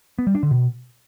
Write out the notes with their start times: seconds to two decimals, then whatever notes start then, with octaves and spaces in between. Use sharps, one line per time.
0.19 B3
0.27 G3
0.35 D4
0.43 D3
0.51 B2